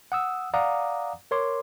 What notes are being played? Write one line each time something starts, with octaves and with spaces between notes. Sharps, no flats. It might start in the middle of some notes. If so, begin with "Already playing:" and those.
F#5 D#6 E6
D5 F5 F#5 A#5 D6 D#6
A#4 C#5 C6 D6